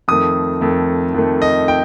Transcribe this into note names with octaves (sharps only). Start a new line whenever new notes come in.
F2 D#3 A3 D#6
F2 D#3 A3
F2 D#3 A3
D#5
G5